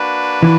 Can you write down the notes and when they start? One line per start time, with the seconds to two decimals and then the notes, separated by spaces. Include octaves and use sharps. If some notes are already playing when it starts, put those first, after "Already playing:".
Already playing: A#3 D4 F#4 B4
0.43 E3